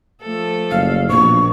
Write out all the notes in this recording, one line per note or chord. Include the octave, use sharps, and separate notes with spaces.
F3 A3 A4
F#1 F5
A#1 B2 C#6